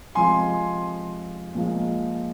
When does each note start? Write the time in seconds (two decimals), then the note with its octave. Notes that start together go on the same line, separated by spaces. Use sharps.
0.15 C3 F3 G#3 G#5 C6
1.55 A#2 F3 G#3